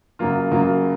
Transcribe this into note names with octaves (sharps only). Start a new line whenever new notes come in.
F#2 C#3 F#3 A#3 F4
F#2 C#3 F#3 A#3 F4